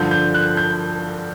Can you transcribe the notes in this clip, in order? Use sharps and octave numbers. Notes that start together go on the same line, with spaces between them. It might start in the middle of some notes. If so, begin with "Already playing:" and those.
Already playing: G2 D3 F3 G6
G6
F#6
G6